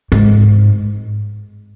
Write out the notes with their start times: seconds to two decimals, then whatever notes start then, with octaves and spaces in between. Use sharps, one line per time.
0.12 G#2